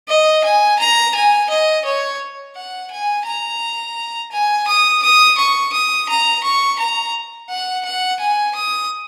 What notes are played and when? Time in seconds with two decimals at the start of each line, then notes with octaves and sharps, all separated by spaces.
0.08 D#5
0.44 G#5
0.79 A#5
1.15 G#5
1.49 D#5
1.85 C#5
2.56 F#5
2.91 G#5
3.26 A#5
4.32 G#5
4.67 D#6
5.02 D#6
5.38 C#6
5.73 D#6
6.09 A#5
6.44 C#6
6.79 A#5
7.49 F#5
7.85 F#5
8.20 G#5
8.55 D#6